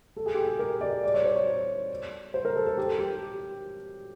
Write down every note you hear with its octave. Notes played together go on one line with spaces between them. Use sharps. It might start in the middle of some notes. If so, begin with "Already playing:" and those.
A4
G#4
G4
G#4
A#4
D5
D5
C#5
C5
C#5
C5
A#4
A4
A4
G4
G4